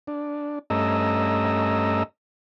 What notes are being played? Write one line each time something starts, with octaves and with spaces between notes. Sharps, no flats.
D4
G2 A3 C#4 D#5 A#5 E6